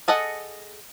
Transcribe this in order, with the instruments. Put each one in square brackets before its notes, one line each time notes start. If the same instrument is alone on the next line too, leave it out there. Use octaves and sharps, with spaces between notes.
[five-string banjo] G#4 A4 D#5 F#5